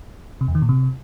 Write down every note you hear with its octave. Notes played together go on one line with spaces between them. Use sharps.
C3
E2
D#3
A#2
C3